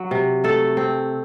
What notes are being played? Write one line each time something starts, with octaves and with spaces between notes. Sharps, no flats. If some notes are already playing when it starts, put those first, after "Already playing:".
Already playing: F#3
C3
A3 A4
C4